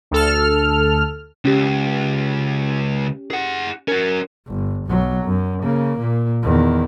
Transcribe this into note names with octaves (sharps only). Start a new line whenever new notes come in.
D2 A4 F6
C#2 C#4 G4
G#4 F#5
C#4 F#4 A#4
G1
B1 F#3
F#2
C#3 A#3
A#2
E2 D#3